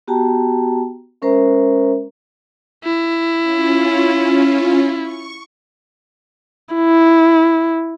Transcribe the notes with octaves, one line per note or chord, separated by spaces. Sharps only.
B3 F#4 G4 G5 A5 A#5
G#3 C#4 A#4 C5 E5 A#5
E4
C#4 F4
C#6
E4